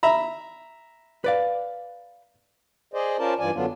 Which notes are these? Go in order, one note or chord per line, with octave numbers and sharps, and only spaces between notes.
E5 A#5 B5
B4 D5 F5
G#4 C5 D5 D#5
C#4 F4 A#4 C5 D5 A5
G2 E3 F4 D5 G#5
F#2 D3 F#3 B3 D4 F4